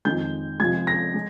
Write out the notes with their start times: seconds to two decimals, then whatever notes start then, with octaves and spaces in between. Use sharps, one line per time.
0.05 F2 D#3 G#3 G6
0.60 C3 F3 G#3 G#6
0.87 A#6
1.14 G#3